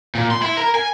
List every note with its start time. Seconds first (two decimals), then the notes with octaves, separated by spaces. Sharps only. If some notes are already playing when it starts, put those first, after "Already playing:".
0.15 A#2
0.31 C6
0.42 E4
0.57 A#4
0.75 G#5